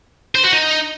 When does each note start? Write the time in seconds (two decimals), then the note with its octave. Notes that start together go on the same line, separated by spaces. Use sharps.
0.35 C5
0.44 F#4
0.52 D#4